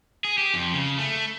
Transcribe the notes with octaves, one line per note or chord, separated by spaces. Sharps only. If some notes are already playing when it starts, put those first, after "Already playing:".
G#4
G4
F2
C#3
A3